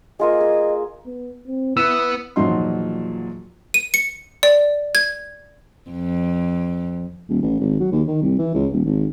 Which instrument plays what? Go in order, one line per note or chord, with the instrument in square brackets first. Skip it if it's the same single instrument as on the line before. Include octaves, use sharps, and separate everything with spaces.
[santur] A#3 F4 G#4 [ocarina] D#5
[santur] G#4
[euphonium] B3
C4
[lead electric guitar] B3 [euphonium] E4 [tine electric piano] E6
[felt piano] E2 A#2 F3 F#3 D#4 C6
[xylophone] D#7
C#7
D5
G#6
[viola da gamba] F2
[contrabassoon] D#1
A1
G#1
F#3
D#2
D#3
C2
E3
C#2
D#1
G#1